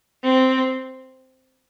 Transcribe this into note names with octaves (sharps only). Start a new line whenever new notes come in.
C4